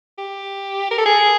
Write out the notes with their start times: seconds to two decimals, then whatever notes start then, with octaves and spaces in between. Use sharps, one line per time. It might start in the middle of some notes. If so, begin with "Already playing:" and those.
0.18 G4
0.91 A#4
0.98 A4
1.06 G#4